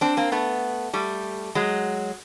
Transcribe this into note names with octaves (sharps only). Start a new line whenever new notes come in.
C4 D4
A#3 C4
A3 B3
G3 A3
F#3 G#3